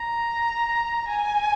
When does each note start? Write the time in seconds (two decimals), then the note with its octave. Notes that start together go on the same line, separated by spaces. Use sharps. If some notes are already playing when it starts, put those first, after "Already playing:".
Already playing: A#5
1.08 G#5